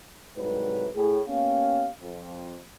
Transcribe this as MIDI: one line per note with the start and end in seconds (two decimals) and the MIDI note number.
0.36 0.88 36
0.36 0.88 44
0.36 0.88 54
0.36 0.88 55
0.36 0.88 57
0.36 0.88 71
0.95 1.19 45
0.95 1.19 68
1.28 1.89 58
1.28 1.89 59
1.28 1.89 61
1.28 1.89 67
1.28 1.89 77
2.01 2.58 41